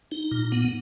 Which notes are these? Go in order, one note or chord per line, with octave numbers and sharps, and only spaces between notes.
D#4
A#2
B3